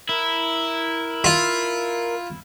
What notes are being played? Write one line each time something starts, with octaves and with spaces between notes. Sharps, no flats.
E4 A#4
F4